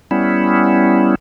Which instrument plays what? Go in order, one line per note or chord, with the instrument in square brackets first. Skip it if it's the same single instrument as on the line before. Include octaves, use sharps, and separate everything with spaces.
[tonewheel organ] G3 B3 C#4 E4